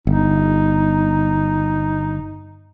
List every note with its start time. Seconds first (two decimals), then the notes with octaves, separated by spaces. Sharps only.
0.07 G1 D#4